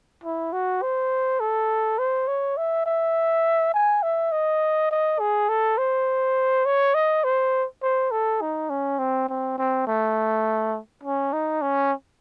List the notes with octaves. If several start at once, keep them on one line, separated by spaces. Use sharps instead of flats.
E4
F#4
C5
A4
C5
C#5
E5
E5
G#5
E5
D#5
D#5
G#4
A4
C5
C#5
D#5
C5
C5
A4
D#4
C#4
C4
C4
C4
A3
C#4
D#4
C#4